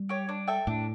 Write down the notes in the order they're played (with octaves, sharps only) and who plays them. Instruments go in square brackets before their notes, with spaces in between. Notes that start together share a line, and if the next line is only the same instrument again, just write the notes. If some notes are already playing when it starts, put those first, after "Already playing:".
Already playing: [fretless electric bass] G3
[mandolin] G4 C#5
D4
A4 E5 G5
[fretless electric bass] A2 [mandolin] D4